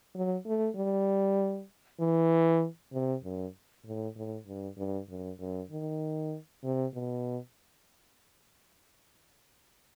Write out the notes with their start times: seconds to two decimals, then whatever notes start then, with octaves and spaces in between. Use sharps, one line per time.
0.15 F#3
0.46 A3
0.76 G3
2.00 E3
2.93 C3
3.24 F#2
3.86 A2
4.16 A2
4.47 G2
4.78 G2
5.09 F#2
5.40 F#2
5.71 D#3
6.64 C3
6.94 B2